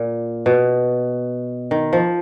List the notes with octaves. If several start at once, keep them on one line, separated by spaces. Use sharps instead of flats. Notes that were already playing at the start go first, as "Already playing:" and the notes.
Already playing: A#2
B2
D#3
F3